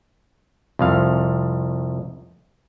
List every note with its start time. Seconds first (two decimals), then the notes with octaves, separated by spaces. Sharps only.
0.79 C2 F2 F5